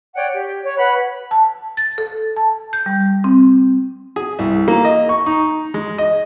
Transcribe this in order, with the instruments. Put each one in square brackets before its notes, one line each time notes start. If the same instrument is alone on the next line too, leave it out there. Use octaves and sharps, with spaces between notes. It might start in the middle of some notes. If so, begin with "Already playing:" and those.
[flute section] C#5 D5 F#5 G5
G4
C#5
B4 F#5 B5 F#6
[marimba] A5
A6
A4
A5
G6
G3
C4
[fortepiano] G#4
C2
A#3
D#5
C#6
D#4
G#3
D#5